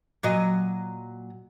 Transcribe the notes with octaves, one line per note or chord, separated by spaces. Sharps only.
A#2 F#3 D#5